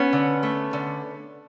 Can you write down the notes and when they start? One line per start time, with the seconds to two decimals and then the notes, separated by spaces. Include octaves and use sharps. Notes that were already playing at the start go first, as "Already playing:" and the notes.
Already playing: B3 C#4
0.13 D3
0.43 A3
0.73 D3